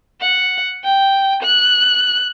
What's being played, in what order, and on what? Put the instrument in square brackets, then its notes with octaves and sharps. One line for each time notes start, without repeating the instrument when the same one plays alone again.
[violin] F#5
G5
F#6